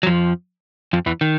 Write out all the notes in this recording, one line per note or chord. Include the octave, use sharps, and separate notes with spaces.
F#3
F2 F3
F2 F3
E2 E3
D#3